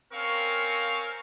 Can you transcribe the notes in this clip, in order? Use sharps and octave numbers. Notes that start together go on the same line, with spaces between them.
C4 C#4 A#4 F5 C#6